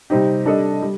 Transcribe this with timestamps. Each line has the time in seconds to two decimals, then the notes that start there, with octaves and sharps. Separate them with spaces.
0.10 C3 G3 C4 D#4 G4
0.45 G3 D4 A4 D#5
0.82 G3